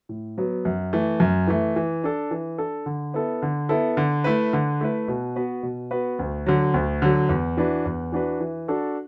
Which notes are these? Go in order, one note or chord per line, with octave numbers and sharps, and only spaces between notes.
A2
F#3 B3
F#2
E3 A3
F#2
E3 A3
E3
D4 A4
E3
D4 A4
D3
B3 E4 A4
D3
B3 E4 A4
D3
A3 E4 B4
D3
A3 E4 B4
B2
B3 F#4 B4
B2
B3 F#4 B4
D2
D3 F#3
D2
D3 F#3
E2
E3 D4 F#4 B4
E2
E3 D4 F#4 B4
E3
D4 F#4 A4